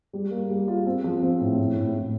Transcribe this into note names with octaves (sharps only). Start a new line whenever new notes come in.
G3
A#3
G3
F4
C4
F3
C4
A2
A2
A2
A2